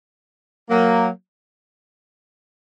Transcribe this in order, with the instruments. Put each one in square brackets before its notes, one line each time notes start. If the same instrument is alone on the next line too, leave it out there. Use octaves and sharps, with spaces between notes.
[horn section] F#3 A#3